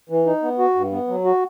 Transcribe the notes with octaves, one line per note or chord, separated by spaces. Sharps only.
E3
D#4
B3
F#4
G2
B3
F#3
F#4